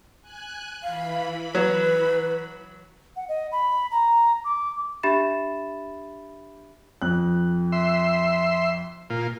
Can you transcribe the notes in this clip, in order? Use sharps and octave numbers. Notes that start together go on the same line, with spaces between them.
G#5 F#6
E3 F5 B5
F#3 B4
F#5
D#5
B5
A#5
D6
D4 G4 E5 B5 A6 E7
F2 F#6
E5 C6
A#2 F4